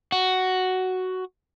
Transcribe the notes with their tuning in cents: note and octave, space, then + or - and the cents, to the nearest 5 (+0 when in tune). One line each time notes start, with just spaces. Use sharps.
F#4 +5